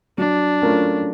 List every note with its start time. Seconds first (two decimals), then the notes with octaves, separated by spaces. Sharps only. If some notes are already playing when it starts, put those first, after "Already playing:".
0.18 F#3 D4
0.62 A3 C#4 F4 A#4